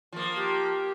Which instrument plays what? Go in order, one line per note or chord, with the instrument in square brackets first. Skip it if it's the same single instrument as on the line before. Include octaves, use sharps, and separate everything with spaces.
[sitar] F3 A#3
[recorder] G4